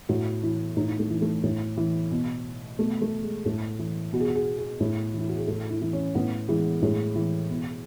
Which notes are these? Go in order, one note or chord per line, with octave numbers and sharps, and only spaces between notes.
A2 F#4
E3 E4
A2 D#4
A3
E3
A3
A2
E3
B2
B2 A3
A3
G#3
A2 A3
E3
B2 F#4
G#4
F#4
G#4
G#4
A2
E3 E4
F#4
G#4
A2 A4
E4
E3
C#4
A2 B3
E3 G#3
A2 G#3
E3
B2